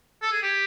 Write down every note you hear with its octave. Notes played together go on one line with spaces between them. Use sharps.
A4
G#4
G4